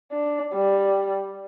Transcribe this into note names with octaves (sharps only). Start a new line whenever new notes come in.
D4
G3